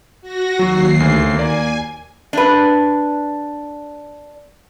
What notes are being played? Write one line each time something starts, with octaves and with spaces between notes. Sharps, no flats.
F#4 A#6
D#2 F#3 C7
D2
A#3 D5 G#5
D4 B4